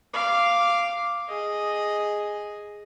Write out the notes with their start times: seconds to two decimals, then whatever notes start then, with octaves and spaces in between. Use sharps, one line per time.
0.13 F5 D6
1.29 G#4 D#5